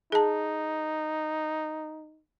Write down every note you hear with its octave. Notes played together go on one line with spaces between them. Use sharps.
D#4 G#4 A5